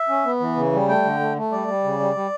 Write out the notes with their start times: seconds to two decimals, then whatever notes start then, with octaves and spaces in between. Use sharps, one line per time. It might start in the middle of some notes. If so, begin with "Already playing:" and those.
Already playing: E5
0.09 C#4
0.25 B3
0.40 E3
0.56 C#3
0.73 G3
0.88 A3 G5
1.04 D3
1.20 A3
1.36 A3
1.52 G3 D5
1.68 G3
1.84 C#3
2.00 G3
2.15 G3